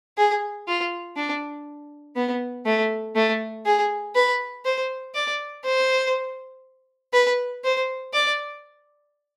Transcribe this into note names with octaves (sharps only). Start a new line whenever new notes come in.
G#4
F4
D4
B3
A3
A3
G#4
B4
C5
D5
C5
B4
C5
D5